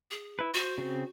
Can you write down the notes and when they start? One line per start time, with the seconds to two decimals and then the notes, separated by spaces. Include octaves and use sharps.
0.11 G#4
0.39 E4 B4
0.54 F#4 C5
0.78 C#3 C4